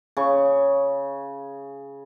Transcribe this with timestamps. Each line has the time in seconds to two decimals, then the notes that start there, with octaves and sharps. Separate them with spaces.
0.17 C#3 C#6